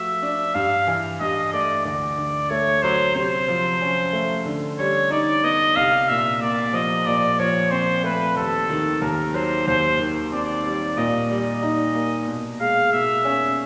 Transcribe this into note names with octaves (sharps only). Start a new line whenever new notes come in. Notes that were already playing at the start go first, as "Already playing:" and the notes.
Already playing: F3 A3 F#4 E5
D4
G2 F5
E3
G2 D#5
A3 D5
D2 D5
D3
A3 C#5
F#3 C5
C3 C5
F3
C#4
A3
D3
G3 C#5
D#4 D5
B3 D#5
C2 F5
A#2 E5
A#3 D5
F3 D#5
A#2 D5
F3 C#5
C4 C5
A3 B4
D#2 A4
D#3
D#2 A#4
F#3 C5
D#2 C5
D#3
C4 D5
G3
A#2 D#5
G3
D#4
A#3
B2
G#3 F5
B2 E5
C#4